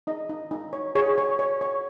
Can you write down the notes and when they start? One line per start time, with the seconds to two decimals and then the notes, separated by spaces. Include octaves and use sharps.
0.07 D#4 D#5
0.29 D#4
0.51 D#4
0.73 C#5
0.95 G#4 C#5
1.18 C#5
1.39 C#5
1.61 C#5